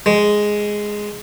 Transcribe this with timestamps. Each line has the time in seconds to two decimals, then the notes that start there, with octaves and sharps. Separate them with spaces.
0.06 G#3